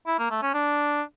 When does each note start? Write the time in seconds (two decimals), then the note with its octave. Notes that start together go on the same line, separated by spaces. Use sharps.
0.07 E4
0.19 A#3
0.30 A3
0.42 C#4
0.54 D4